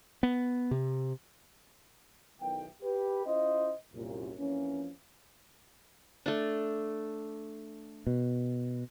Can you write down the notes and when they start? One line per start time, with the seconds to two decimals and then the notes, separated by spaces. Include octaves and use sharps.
0.23 B3
0.71 C3
2.40 B1 D#3 E3 G5
2.82 G4 B4
3.25 C#4 E4 F4 C5 D#5
3.94 C2 F#2 A#2
4.38 F2 E3 F3 A#3 C#4
6.26 A3 D4
8.07 B2